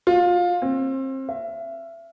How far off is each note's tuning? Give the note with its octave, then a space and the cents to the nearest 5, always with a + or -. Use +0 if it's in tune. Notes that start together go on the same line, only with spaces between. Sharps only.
F4 +20
C4 +30
E5 +25